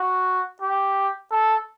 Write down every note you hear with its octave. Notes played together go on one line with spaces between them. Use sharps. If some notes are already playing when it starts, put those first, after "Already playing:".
Already playing: F#4
G4
A4